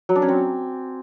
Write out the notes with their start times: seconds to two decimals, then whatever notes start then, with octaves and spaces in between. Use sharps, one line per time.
0.09 F#3
0.15 D4
0.22 C#4
0.28 C4